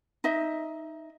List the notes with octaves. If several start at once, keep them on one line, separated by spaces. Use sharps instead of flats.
D#4 D#5 E5